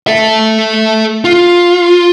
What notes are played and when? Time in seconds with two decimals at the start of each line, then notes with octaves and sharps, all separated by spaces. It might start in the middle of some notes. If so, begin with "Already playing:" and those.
0.07 A4 E5
1.24 F4